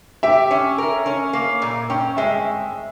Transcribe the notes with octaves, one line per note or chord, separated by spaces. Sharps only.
G4 E5
C#4
A#4
C#4
A#3
A#2
C#4 G5
G#3 E5